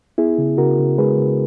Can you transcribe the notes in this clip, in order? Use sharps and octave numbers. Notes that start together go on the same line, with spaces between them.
B3 E4 G#4
C#3
C#3 F#4 A#4
C#3
G#3 G#4 B4
C#3